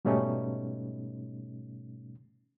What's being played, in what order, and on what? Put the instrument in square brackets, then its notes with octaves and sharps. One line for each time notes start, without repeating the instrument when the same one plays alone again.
[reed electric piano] G#2 B2 G3 A3 C#4 D#4